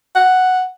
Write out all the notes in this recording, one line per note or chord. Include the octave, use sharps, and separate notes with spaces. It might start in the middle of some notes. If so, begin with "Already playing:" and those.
F#5